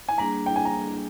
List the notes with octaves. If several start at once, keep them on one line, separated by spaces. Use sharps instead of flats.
G#5
G3 A#3 D4 G#4 A#5
G5
G#5
A#5